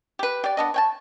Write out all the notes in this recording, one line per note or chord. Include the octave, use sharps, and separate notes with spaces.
G4 B4
G4 D5
B3 D4 D#5
C#5 G5 A5